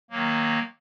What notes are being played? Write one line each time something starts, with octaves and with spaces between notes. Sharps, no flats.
D#3 F#3 A#3